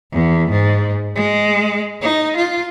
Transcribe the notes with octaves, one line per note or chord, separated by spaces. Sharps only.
E2
G#2
G#3
D#4
F4